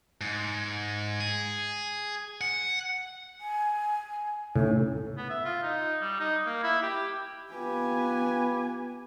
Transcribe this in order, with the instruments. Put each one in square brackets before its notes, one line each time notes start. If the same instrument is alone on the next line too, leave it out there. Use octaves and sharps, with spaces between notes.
[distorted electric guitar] G#2
G#4
F#5
[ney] G#5
[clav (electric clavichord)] A2 [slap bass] C3 C#4 [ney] D#4
[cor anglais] B3
E5
F4
D#4
G3
D#4
A#3
E4
G4
[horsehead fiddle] B3 G#5 [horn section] F4 G4 B4